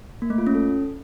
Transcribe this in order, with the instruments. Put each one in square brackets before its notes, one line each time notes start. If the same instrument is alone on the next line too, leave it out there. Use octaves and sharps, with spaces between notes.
[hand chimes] A#3
A3
F4
C#4
A4